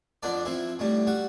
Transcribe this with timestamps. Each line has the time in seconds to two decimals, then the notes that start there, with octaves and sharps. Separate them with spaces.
0.23 F2 D3 D4 D5
0.45 F3 C4 E4
0.79 A2 D3 G3
1.07 G3 F#4